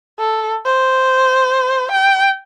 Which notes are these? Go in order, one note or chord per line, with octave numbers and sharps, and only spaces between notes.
A4
C5
G5